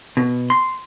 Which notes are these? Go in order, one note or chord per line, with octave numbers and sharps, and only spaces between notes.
B2
C6